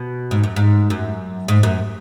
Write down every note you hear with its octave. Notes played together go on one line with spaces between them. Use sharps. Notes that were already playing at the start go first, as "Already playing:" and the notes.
Already playing: B2
G#2
F#2
G#2
F#2
G#2
F#2